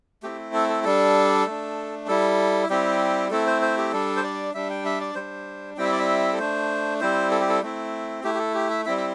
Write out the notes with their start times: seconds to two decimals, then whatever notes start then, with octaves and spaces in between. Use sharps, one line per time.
0.23 A3 C4 E4 G4
0.54 A4
0.69 A4
0.84 G3 D4 A4
1.46 A3 D4
2.07 G3 E4 A4
2.69 G3 C4 E4 G4
3.31 A3 C4 E4 A4
3.47 C5
3.62 C5
3.77 G4
3.93 G3 D4 A4
4.17 C5
4.23 D5
4.54 G3 D4 E5
4.70 G5
4.85 E5
5.01 D5
5.15 G3 D4 C5
5.77 G3 C4 E4 G5
5.84 E5
5.92 D5
5.99 E5
6.33 A4
6.39 A3 D4 C5
7.00 G3 C4 E4 C5
7.31 A4
7.40 G4
7.49 A4
7.62 A3 C4 E4
8.24 A3 E4 G4
8.35 G4
8.39 A4
8.54 G4
8.70 E5
8.85 G3 C4 E4 E5
8.97 E5